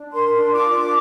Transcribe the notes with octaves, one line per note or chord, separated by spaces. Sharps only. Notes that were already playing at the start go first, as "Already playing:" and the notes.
Already playing: D4
A#4 C6
D4
F4 D6
D4